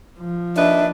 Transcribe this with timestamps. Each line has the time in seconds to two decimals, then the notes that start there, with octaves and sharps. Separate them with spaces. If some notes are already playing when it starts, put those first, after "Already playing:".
0.19 F3
0.56 D#2 D4 B4 D#5 E5